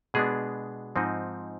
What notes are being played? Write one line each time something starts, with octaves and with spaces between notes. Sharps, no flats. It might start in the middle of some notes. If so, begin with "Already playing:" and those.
B2 G#3 B3 D4 G#4
G#2 F3 C4 D#4